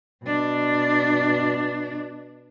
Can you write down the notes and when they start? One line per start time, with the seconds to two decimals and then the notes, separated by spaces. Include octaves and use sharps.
0.24 B2 D4